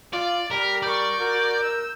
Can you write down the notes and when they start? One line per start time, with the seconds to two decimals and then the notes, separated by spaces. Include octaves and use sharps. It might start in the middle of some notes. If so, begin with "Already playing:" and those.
0.13 F4 D5
0.51 G3 A#4 B6
0.82 A#4 D5 C#6 G6
1.21 F#4 A#4
1.62 E6